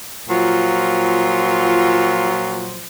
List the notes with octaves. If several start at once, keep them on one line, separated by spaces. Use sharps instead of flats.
A#2 F3 F#3 F4